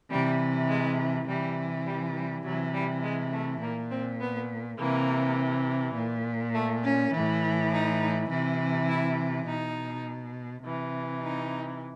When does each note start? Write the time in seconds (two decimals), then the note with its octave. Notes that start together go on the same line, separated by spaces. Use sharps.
0.10 C3 E3 G3
0.69 G#3
1.28 C3 E3 G3
1.86 G3
2.15 G3
2.44 C3 E3 F#3
2.74 G3
3.03 G#3
3.32 A3
3.61 A#2 A#3
3.91 C4
4.20 B3
4.78 C3 E3 A#3
5.95 A#2
6.54 A3
6.83 C#4
7.13 A2 E3
7.72 D#4
8.30 C3 E3
8.88 E4
9.46 B2 D#4
10.64 C3 E3
11.22 D#4